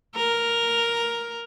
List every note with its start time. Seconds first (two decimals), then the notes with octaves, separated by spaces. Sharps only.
0.16 A#4